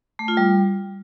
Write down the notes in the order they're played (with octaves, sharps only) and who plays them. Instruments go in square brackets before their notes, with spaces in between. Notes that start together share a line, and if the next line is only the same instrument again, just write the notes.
[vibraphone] A3
F4
G3